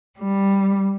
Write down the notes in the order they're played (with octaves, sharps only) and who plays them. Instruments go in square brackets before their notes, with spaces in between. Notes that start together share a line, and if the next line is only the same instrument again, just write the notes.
[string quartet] G3